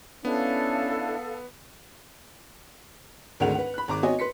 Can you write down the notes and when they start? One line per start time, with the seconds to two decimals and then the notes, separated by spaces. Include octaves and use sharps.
0.25 B3 C#4 D4 E4 A4 F5
3.40 G#1 D2 G#3 A#4 F#5 F7
3.55 B4 F#5
3.74 B5 F#6
3.88 G#1 A#5 D6
4.03 B3 C4 F#4 C#5 D#5 G#5
4.19 B4 C6 B6 C#7